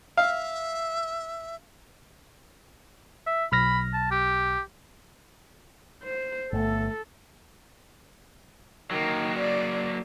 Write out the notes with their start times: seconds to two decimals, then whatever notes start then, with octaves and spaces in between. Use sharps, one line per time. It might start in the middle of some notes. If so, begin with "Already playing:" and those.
0.17 E5 F5
3.27 E5
3.52 B1 B5 F6 A#6
3.93 A5
4.11 G4
6.03 C5
6.53 G1 A3 A4
8.91 D#3 F#3 A#3
9.39 D5